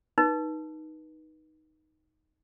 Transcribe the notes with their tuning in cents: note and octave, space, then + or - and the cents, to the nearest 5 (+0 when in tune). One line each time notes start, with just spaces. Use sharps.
D#4 +5 B4 -25